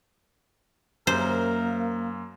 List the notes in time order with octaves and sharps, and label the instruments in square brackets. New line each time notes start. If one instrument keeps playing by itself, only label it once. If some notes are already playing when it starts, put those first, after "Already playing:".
[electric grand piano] F#2 [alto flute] A#3 [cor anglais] A#4 [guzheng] C5